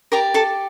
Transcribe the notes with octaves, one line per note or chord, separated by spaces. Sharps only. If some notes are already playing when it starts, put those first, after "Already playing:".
G4 A#4 D5 A#5
A4 A5